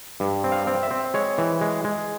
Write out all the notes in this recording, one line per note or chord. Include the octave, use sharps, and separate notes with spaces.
G2
C4
F5
C4
E5
C4
G#3 C#5
E3
G#3
G#3